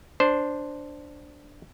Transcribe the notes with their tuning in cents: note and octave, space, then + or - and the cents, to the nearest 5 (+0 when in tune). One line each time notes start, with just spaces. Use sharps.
D4 +0 C5 +0